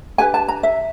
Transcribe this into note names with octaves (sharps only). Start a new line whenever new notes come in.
D4 G4 B4 G#5
A5
A#5
E5